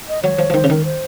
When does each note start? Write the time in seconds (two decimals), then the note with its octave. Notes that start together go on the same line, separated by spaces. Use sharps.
0.09 D#5
0.23 F#3 C#5
0.39 F3
0.50 F3
0.54 D#3 C5
0.64 C#3
0.69 D#3 A#4
0.85 C5